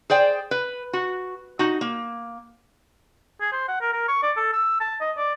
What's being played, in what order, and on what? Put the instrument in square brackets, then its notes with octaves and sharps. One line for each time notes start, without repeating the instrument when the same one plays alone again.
[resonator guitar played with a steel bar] G#4 C5 D5 G5
B4
F#4
D#4 F#4
A#3
[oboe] G#4
C5
F#5
A#4
A#4
C#6
D5
A4
E6
A5
D#5
D5